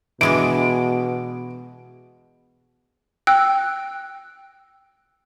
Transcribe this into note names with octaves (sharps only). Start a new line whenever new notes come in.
B2 E3 G#3 D4 D7
G5 E6 F#6